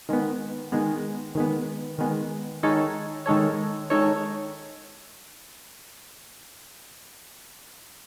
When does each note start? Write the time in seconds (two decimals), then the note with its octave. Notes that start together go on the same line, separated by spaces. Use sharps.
0.09 D#3 G#3 B3
0.72 D#3 G#3 B3
1.35 D#3 G#3 B3
1.98 D#3 G#3 B3
2.63 D#3 G#3 D#4 A4 C#5
3.26 D#3 G#3 D#4 A4 C#5
3.90 D#3 G#3 D#4 A4 C#5